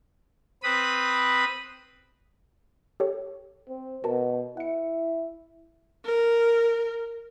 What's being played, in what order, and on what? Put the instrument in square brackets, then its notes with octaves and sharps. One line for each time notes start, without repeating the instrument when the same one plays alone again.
[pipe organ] C4 B4 B5 D#6
[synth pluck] G4 A4 C#5
[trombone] C4
[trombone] B2 [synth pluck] F#4 A#4 A5
[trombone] E4 [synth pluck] F#5 C#7
[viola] A#4